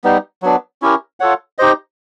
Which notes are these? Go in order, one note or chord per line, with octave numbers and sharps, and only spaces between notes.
G3 B3 D#4
F#3 B3 D4
C#4 E4 G4 A#4
F4 A4 C#5 F#5
D#4 G4 C5 D#5